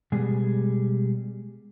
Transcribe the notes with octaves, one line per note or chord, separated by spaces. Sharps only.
B2 G3 G#3 G#4